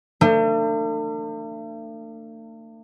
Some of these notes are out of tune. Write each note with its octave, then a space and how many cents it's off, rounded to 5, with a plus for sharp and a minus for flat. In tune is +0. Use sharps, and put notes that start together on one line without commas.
A3 +45 D4 +35